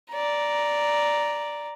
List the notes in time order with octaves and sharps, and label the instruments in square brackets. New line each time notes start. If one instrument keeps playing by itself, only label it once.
[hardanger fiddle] D5 A#5